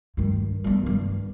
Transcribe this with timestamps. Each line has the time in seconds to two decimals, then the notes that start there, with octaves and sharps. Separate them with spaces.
0.17 G2 D#3
0.64 G3 B3
0.83 G2 D#3